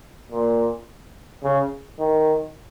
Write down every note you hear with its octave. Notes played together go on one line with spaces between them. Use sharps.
A#2
C#3
D#3